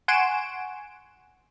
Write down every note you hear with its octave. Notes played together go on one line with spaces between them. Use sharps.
F#5 G#5 C6 C#6 D7 E7